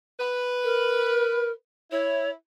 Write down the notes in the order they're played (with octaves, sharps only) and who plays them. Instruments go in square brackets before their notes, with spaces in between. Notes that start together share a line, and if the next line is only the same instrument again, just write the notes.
[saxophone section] B4
[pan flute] A#4
[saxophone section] E4 [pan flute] C#5